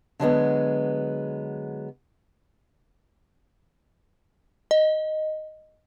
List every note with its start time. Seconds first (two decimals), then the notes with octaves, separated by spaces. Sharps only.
0.20 D3 F#3 G#3 B3
4.71 D#5